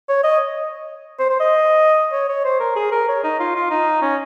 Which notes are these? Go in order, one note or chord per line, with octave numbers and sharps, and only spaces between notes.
C#5
D#5
C5
C5
D#5
C#5
C#5
C5
A#4
G#4
A#4
C#5
D#4
F4
F4
D#4
C#4